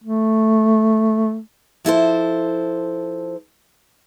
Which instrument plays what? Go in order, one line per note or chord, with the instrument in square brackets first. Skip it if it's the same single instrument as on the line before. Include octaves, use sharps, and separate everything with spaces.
[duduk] A3
[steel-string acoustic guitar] F3 E4 A4 C5